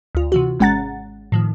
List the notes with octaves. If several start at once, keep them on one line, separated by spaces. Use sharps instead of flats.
D2 F4
C3 E3 F#4
G#1 G#3 C#4 F#5 A#5 A6
A2 D#3 F3